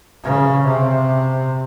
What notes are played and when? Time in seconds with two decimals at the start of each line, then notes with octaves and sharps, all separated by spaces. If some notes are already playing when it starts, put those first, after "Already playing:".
0.24 C#3
0.67 C3